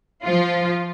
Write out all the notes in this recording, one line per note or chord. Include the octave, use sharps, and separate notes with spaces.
F3 F4